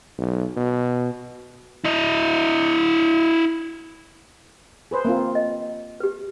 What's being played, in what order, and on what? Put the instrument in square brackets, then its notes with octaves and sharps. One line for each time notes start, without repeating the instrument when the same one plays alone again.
[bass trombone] B1
B2
[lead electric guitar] E4 D#5
[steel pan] G#4 B4 C5
A#3 C4 F4
[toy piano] D#5
G4 B4